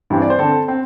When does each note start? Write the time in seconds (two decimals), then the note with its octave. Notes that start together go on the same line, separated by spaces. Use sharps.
0.10 G2 E3 G3 C4
0.22 D5
0.30 C5
0.39 D3 C4 A4
0.68 C4